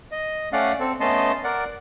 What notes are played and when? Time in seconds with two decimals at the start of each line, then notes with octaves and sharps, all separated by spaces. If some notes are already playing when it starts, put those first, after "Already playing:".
0.12 D#5
0.53 A3 C#4 D5 F5 F#5
0.80 C4 A4
1.00 A3 B3 C#4 D#5 A5 C6
1.44 A#4 D5 F#5